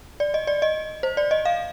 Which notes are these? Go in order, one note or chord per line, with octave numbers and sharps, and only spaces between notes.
D5
D#5
D5
D#5
C5
D5
D#5
F5